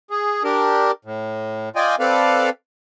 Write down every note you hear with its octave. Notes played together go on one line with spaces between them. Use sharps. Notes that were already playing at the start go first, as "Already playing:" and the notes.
G#4
D4 G4 A#4
A2
F4 D5 D#5 G5 G#5
C4 A4 B4 D5 F5